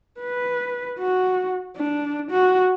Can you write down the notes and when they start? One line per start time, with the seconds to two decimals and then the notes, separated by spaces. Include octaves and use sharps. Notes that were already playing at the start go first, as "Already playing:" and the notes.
0.21 B4
0.99 F#4
1.76 D4
2.31 F#4